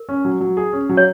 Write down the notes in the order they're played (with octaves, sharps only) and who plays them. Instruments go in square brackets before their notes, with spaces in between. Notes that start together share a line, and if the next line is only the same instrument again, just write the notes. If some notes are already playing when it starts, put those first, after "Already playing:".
Already playing: [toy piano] A#4
[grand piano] C#4
F#3
F#3
G#4
C#4
F#3
[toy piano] C#5